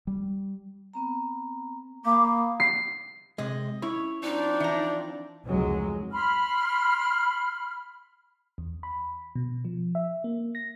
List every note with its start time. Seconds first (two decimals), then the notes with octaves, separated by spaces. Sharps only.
0.07 G3
0.94 B3 C4 A#5
2.06 A#3 F5 B5 D6 D#6
2.60 C7
3.38 C3 G#3 D#5
3.82 C#4 E4 C#5 B5
4.23 F3 C4 D4 D#4
4.60 E3 A#5
5.45 F1 C#2 F#3 G#3
6.11 B5 C6 F6
8.58 E2
8.83 B5
9.36 B2
9.65 F3
9.95 E5
10.24 A#3
10.55 A#6